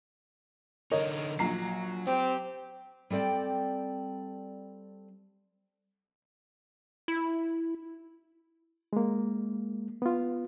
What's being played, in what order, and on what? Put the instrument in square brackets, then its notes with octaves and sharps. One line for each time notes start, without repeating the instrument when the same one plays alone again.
[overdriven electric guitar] D3 D#4 [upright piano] A#4 C#5 D#5
[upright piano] A#1 A#5 C7 [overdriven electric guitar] F#3
[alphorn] C4 [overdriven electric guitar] G4
[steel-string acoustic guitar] G3 C4 A4 D5 G5
[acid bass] E4
[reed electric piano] G#3 A#3
B3 F4